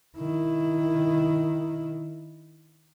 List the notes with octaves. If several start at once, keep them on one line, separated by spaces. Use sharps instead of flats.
D#3 E4